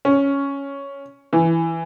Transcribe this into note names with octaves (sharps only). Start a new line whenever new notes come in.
C#4
E3